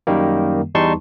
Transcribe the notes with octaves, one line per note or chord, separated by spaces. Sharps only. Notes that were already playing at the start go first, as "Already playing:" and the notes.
F#2 D#3 G3 A#3
E2 G3 D#4 A5 C6 C#6